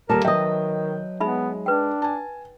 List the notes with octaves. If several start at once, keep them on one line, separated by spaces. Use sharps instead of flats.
D#2 G3 A4 A#4 A5
D#3 F#3 B4 D#5 E5 G5 D#6
G#3 B3 D#4 E5 B5
D4 B4 G5
G#5 A5